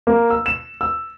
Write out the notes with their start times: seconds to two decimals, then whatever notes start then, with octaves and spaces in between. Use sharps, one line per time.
0.07 A#3
0.30 E6
0.46 E7
0.81 E6